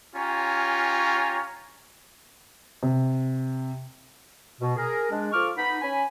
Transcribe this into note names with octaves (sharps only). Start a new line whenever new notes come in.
C#4 F4 G4 C#5 G#5 A#5
C3
B2
G#4 A#4
G#3 D4
F3 F4 A4 C#6 D6 F6
B3 D#4 B5
C#4 G#5 B5